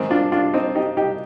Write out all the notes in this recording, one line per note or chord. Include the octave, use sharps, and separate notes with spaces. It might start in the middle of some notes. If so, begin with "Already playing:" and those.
Already playing: G#2 D#3 C4 D#4
D4 F4
D4 F4
C4 D#4
D#4 G4
D#4 G4